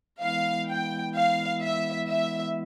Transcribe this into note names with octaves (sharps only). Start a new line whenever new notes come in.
E3 G#3 B3 E4 F5
G5
F5
E5
E5